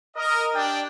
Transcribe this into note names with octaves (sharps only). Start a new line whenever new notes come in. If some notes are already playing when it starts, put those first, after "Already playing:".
A#4 D#5
D4 G4 D5 G5